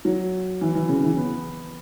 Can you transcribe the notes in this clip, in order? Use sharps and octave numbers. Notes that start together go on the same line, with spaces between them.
F#3
E3
E3
C#3
E3
B3